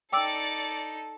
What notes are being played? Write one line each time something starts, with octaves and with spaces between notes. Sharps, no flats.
D#4 A4 D5 G5 D6 E6 A6